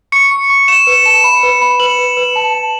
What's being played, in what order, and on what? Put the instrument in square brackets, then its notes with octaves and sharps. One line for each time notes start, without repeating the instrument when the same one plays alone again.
[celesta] C#6 [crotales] C#7
[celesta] C#6
C#6
[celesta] C#6 [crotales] E7
[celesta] B4 [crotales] E7
[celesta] A5 [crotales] E7
[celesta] B5
B4
B5
[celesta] B4 [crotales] F#7
[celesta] B4
B4
A5
A5